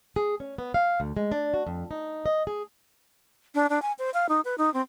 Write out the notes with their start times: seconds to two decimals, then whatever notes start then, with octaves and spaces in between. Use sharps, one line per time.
0.16 G#4
0.40 C#4
0.58 B3
0.74 F5
1.00 D2
1.17 G#3
1.32 D4
1.54 F#4
1.67 F2
1.91 D#4
2.26 D#5
2.47 G#4
3.55 D4
3.70 D4
3.82 G#5
3.99 C5
4.14 F5
4.29 D#4
4.45 B4
4.58 D#4
4.74 C4